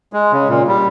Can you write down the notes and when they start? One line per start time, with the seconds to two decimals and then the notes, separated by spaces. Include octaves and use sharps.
0.13 G#3
0.32 C#3
0.48 A#2
0.68 G3